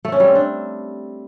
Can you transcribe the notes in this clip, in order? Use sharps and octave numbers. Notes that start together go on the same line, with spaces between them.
A3
C#4
G3
C4
D4